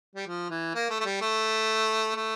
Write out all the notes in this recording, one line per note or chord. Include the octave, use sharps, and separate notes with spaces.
G3
F3
E3
A#3
A3
A3
G3
A3
A3